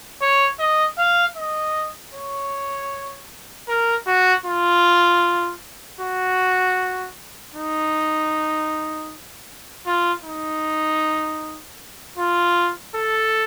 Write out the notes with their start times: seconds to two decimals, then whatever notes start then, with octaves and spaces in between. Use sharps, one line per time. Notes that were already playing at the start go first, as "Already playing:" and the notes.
0.21 C#5
0.60 D#5
0.98 F5
1.37 D#5
2.14 C#5
3.68 A#4
4.07 F#4
4.46 F4
6.01 F#4
7.55 D#4
9.86 F4
10.25 D#4
12.18 F4
12.95 A4